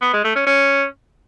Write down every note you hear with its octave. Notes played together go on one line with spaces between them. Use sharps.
B3
G#3
A3
C#4
C#4